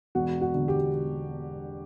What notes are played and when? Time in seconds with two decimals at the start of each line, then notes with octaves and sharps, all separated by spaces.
0.15 E1 F#4
0.41 F#4
0.55 D3
0.68 G4